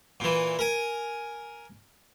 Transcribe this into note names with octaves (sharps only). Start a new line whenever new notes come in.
A#2 E3
A#4 G#5